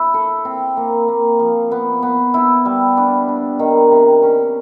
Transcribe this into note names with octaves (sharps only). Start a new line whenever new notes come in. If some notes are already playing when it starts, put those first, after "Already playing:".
Already playing: E4
A4
C4
A#3
A#3
F3
B3
B3
E4
G3
D4
D4
D#3
C3
C#4